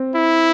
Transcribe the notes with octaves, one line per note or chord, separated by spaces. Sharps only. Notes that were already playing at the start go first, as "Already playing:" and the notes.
Already playing: C4
E4